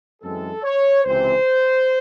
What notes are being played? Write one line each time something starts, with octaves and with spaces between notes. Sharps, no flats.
F#2 E3 G#3 C4 A4
C#5
C#2 C3 E3 C4 C5